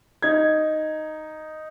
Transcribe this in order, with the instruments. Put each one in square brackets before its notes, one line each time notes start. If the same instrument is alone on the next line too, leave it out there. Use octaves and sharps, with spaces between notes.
[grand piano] D#4 G#6